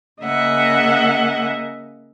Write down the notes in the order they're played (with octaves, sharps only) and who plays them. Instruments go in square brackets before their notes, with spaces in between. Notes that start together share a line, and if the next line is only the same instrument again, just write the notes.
[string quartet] C#3 A#3 D#5 E5 F#5